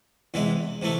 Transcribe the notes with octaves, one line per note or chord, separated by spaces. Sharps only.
E2 C3 E3 G#3
C3 E3 A3